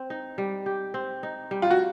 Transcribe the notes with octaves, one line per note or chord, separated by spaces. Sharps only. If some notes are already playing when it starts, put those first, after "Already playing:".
Already playing: C4
D#4
G3
G4
C4
D#4
G3
F4
F#4